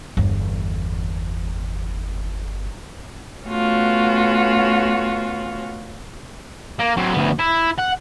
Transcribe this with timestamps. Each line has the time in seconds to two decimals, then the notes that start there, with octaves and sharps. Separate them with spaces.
0.17 G1 E2
3.47 A3 B3 C#4 F4 F#4
6.79 A#3
6.97 F#3 C4
7.13 D2 B3
7.39 E4
7.79 F#5